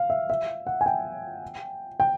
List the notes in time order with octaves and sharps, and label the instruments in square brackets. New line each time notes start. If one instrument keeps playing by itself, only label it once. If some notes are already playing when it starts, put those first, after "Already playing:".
Already playing: [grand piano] F5
E5
E5
F#5
G#5
G5
G5